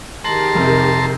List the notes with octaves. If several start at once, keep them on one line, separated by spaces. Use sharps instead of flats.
D#3 G4 G#4 A5 A#5 C6 F#7
F2 C3